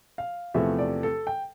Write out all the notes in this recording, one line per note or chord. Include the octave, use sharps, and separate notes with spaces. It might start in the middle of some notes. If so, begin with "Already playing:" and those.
F5
E2 C3 F3 A3 E5
D5
A4
G5